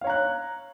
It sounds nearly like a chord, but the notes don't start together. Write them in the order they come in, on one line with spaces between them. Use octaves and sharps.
F5 C#5 A#5 F#6